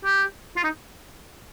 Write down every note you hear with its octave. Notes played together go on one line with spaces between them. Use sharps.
G4
F4
D#4